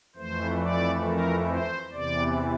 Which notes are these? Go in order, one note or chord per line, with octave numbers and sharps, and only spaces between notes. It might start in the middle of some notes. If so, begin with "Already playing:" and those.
F2 E3 A3 C5
D5
A#4
C5
E2 C3 E3 D5